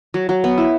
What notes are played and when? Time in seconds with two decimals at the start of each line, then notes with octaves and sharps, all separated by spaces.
0.14 F#3
0.29 F#3
0.44 B3
0.58 E4